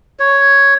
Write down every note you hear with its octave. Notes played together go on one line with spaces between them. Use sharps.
C#5